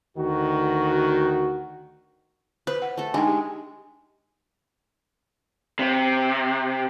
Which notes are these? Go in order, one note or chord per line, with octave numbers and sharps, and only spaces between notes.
D2 D#3 F#4
B4 C5
F#5
A3 A4
G#3 D4 D#4 G5
G4
C3